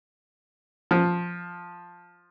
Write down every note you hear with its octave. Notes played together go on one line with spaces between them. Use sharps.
F3